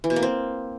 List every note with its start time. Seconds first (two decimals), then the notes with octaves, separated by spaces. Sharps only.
0.04 E3
0.10 B2
0.16 A#3
0.23 C4